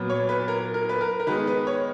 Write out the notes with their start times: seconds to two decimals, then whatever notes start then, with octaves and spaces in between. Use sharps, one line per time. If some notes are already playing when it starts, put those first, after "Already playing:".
Already playing: A#2 F#3 B3
0.10 C#5
0.29 B4
0.48 A#4
0.74 A#4
0.89 B4
1.01 A#4
1.20 A#4
1.27 D#3 G#3 B3 B4
1.47 B4
1.67 C#5